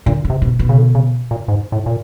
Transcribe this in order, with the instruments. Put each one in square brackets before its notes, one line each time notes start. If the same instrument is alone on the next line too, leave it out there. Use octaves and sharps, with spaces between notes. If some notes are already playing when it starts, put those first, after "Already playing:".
[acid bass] A#2 [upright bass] D3
[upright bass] C#3
[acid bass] C3
[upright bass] B2
B2
[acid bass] C#3
D3
C#3
A#2
G#2
A2
A#2